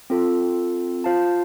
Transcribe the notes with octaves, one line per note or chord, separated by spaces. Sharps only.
C4 F4 A4
F4 C5 F5 A5